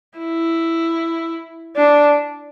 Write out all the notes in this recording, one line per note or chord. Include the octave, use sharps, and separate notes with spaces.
E4
D4